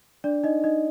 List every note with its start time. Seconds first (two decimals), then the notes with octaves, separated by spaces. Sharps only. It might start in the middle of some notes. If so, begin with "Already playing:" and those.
0.24 D4 D5
0.44 D#4 D#5
0.64 D#4 D#5